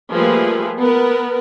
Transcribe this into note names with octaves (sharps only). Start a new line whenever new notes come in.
F3 G3 A3 A#3 G#4 B4
B3 A#4 B4